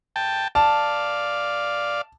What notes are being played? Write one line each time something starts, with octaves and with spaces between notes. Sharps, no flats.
G5 A5
D5 F5 A5